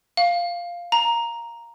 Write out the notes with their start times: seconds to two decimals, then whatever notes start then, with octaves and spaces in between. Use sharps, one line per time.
0.17 F5
0.92 A#5